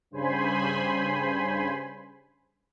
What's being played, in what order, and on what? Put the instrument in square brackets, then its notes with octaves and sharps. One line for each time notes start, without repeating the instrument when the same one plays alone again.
[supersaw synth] G2 C#3 C5 G#5 B5 C6